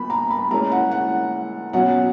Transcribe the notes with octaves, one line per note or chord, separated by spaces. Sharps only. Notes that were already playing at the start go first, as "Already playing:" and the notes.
Already playing: A#2 B3 B5
A#5
B5
A#2 G#3 C#4 E4 A#5
F#5
F#5
B2 F#3 C#4 F#5